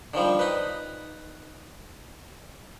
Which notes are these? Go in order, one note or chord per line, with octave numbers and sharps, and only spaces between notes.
D3 D#3 F3 G3
D#4 B4